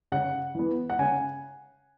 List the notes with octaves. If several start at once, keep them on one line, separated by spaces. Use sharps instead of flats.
C#3 F#5
E3 B3
F#5
C#3 G#5